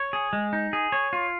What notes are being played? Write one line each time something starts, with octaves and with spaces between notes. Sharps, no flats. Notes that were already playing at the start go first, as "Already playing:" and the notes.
Already playing: C#5
G#4
G#3
D#4
G#4
C#5
F4